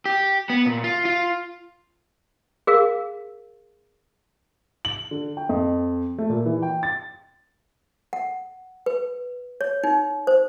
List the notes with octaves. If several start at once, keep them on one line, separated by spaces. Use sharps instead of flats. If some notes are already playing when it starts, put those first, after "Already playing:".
G4
B3
A#2
F4
F4
G#4 A#4 F5
F#7
D3
G5
F2
A3
A#2
E3
G5
A6
F#5
B4
C#5
D#4
C5